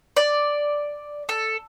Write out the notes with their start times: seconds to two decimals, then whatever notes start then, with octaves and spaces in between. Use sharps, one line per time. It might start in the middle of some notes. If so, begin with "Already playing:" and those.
0.17 D5
1.29 A4